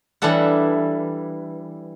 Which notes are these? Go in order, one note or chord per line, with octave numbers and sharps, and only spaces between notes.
E3 G3 D4 A4 E5 F#5